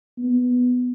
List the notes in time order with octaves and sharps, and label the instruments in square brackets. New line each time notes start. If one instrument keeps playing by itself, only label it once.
[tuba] B3